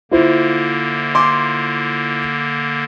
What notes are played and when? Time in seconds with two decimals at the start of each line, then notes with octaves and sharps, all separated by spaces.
0.11 D3 A#3 E4 F4 C5
1.15 C6 D6